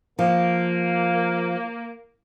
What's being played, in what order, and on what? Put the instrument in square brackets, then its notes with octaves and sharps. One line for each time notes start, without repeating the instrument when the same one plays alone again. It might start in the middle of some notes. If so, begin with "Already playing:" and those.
[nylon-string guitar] F3 [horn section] A#3